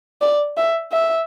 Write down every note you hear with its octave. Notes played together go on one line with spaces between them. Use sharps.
D5
E5
E5